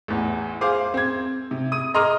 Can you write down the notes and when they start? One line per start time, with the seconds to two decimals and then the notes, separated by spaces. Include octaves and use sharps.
0.08 A1 E2
0.61 G#4 C5 F5 D6
0.94 C4 G#6
1.51 C3
1.72 D#6 D#7
1.94 D#5 A#5 C6 D6 D#6 F6